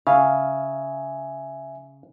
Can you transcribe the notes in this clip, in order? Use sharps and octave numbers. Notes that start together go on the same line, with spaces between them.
C#3 E5 F5 G#5